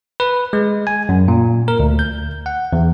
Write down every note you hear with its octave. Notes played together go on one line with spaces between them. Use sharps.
B4
G#3
G#5
F#2
A#2
A#4
D2
G6
F#5
E2